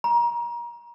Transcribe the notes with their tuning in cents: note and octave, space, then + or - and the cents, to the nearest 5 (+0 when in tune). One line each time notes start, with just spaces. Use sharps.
A#5 +30